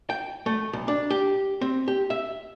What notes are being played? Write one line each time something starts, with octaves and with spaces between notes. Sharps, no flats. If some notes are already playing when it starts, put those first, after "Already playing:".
G5
A3
B1
D4
G4
C4
G4
E5